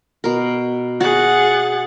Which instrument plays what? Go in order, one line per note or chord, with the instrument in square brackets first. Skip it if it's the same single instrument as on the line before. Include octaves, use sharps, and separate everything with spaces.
[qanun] B2 A#4
[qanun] F#4 [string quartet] G#4 F#5 A6